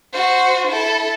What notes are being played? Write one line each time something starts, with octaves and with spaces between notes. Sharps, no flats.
F#4 C5
E4 A4